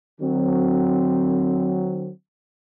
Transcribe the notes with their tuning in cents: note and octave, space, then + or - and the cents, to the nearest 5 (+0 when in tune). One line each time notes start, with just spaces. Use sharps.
D3 +45 F#3 +0 C4 +0